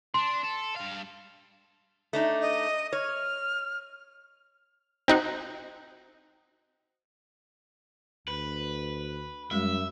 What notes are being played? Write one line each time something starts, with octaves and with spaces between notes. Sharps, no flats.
D4 C6
A4
G2 F5
A3 D4 D#4
D#5
C#5 F6
C4 D#4 F#4
D2 B4
F#2 G3 G#3 E5